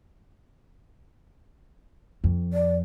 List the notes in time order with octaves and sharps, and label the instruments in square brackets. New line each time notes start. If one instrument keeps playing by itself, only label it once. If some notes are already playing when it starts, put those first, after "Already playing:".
[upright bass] F2
[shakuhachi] D5